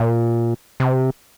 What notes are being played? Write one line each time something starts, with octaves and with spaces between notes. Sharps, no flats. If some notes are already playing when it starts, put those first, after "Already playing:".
Already playing: A#2
C3